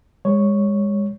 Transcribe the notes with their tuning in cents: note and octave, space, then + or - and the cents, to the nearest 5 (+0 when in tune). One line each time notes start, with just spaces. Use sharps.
G#3 -35 C#5 +0